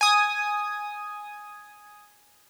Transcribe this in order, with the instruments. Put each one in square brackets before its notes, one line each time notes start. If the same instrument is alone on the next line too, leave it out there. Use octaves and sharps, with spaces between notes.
[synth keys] G#5 D#6